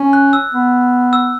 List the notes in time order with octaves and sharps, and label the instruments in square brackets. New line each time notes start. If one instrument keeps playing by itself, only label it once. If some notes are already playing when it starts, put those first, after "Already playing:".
Already playing: [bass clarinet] C#4
[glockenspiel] F#6
E6
[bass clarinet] B3
[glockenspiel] E6